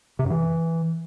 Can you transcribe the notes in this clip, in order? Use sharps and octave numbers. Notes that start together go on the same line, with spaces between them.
C3
F#2
E3